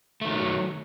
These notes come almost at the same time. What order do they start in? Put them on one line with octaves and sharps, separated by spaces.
A3 D#3 F#3